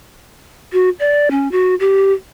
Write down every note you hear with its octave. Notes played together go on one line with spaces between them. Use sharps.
F#4
D5
C#4
F#4
G4